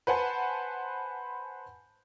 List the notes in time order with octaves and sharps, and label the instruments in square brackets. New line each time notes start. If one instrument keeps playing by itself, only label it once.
[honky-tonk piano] B4 C5 F#5 G#5 A5